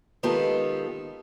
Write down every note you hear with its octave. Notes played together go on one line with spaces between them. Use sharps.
D#3 G#3 B3 F4 G4 A4